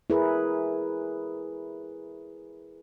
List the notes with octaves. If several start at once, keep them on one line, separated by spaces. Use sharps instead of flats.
E4 G#4 A#4 B4